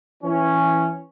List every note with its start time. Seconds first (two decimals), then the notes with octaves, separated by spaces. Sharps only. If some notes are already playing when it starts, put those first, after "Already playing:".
0.23 E3 C#4